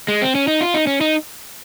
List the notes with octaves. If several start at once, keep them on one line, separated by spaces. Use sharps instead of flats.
G#3
C4
C#4
D#4
F4
D#4
C#4
D#4